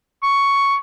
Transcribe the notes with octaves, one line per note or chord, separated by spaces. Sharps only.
C#6